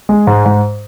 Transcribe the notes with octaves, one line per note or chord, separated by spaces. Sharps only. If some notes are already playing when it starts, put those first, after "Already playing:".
G#3
G#2
G#2